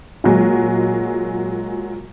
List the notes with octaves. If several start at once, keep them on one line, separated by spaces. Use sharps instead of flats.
A#2 F#3 G#3